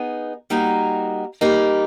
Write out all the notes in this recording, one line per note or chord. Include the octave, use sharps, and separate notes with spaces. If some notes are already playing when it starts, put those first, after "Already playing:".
Already playing: B3 D#4 G#4
G3 A#3 D#4 F#4 A#4
G3 A#3 D#4